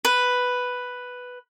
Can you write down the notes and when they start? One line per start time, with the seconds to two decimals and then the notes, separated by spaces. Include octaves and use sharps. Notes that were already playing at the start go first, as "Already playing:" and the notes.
0.05 B4